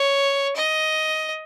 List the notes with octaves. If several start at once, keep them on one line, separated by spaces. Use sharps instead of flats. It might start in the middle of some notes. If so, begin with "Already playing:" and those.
Already playing: C#5
D#5